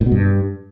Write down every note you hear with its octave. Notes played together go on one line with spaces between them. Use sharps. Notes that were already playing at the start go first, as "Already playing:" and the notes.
A2
B2
G2